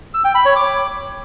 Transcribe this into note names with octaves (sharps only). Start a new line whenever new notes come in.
E6
G5
B5
C#5
D6